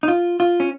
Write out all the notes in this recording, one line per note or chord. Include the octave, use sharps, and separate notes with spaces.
D#4
F4
F4
C#4